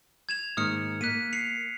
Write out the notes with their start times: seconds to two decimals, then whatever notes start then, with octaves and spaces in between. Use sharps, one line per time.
0.29 G#6 E7 F7
0.57 G#2 D#3 A#3 D#6 F6 C#7
1.01 A#3 F#6 B6 D#7
1.33 C7 C#7 F7